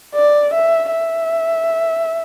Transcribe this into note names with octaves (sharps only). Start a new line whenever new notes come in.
D5
E5
E5